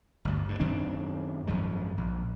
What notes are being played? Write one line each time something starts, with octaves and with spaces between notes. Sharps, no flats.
G1 D2
G2
F#2 D#3 C4 D4
G#1 F#2 F3 G#3
A#1